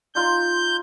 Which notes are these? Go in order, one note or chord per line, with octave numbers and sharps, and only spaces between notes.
D#4 F4 C6 G6